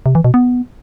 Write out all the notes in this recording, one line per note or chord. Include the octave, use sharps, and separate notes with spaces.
C3
E3
B2
B3